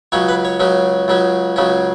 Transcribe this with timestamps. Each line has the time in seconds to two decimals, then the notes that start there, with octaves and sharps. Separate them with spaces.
0.12 C#2 C#3 F#3 C#4 C#5
0.29 B4
0.45 C#5
0.60 C#2 C#3 F#3 C#4
1.08 C#2 C#3 F#3 C#4
1.56 C#2 C#3 F#3 C#4